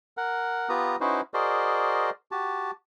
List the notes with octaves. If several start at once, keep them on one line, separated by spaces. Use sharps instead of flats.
A#4 F#5
B3 F4 G4 B4 A#5 D#6
C#4 D#4 E4 F#4 B4 C5
F#4 G#4 A#4 C5 D5 D#5
F#4 G4 A5